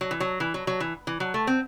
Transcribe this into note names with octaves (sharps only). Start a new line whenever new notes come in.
F#3
E3
F#3
E3
F#3
F#3
E3
E3
F#3
A3
C4